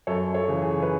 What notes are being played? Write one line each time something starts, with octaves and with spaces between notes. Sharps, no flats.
F#2 A4 C#5
A4 C#5
C#3 E3
G#4
B4